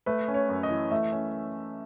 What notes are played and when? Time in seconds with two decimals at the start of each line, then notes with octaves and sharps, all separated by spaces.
0.06 A3 B4
0.28 C#4
0.34 C#5
0.49 F#2
0.63 D#5
0.70 E3
0.91 A3 E5
1.12 C#4